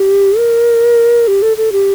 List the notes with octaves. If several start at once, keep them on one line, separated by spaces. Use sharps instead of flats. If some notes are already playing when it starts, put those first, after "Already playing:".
Already playing: G4
A#4
G4
A4
A4
G4